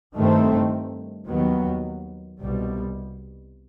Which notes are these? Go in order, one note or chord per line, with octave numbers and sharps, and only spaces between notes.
G2 D#3 A3 C4
D#2 D#3 F#3 B3
C2 B2 G3